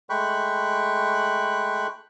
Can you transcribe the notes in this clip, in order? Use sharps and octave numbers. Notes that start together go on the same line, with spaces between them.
G#3 A3 G5 B5 C#6 F#6